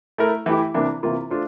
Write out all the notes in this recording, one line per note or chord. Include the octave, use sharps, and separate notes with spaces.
A3 E4 A#4
E3 A3 E4 G4
C3 E3 A#3 D4
C3 E3 A#3 F4
A3 D4 F4 C5